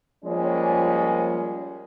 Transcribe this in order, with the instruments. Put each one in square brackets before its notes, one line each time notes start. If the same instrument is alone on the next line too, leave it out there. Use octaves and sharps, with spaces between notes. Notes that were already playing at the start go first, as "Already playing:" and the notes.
[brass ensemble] F3 G3 G#3 A#3 C#4